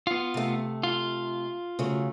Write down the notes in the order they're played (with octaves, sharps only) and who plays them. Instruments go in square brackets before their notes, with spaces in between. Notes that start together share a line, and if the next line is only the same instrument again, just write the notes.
[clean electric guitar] B3 F4
[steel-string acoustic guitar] C3 A3
[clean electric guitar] F4
[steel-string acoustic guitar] C#3 F#3 A3